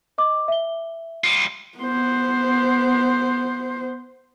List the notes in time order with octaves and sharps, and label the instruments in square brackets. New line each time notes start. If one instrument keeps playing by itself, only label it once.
[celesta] D#5 D6
E5 G7
[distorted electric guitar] G3 F4
[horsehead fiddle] B3 C5